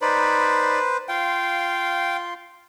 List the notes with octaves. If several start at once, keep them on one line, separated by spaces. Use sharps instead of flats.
D#4 B4 C5 D5 B5
F4 F5 G5 C6